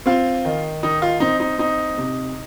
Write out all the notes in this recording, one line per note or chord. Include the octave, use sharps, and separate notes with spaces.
C4 F4
D#3
D#3 D#4
F4
C4 D#4
D#4
C4 D#4
C3